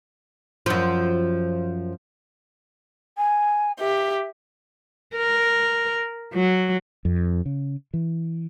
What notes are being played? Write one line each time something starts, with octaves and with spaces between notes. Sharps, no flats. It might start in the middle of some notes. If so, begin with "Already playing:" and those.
F#2 F3
G#5
G4 E5
A#4
F#3
F2
C#3
E3